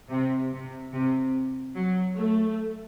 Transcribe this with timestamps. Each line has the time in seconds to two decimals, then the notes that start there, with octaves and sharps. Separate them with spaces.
0.10 C3
0.51 C3
0.92 C3
1.74 F#3
2.16 A3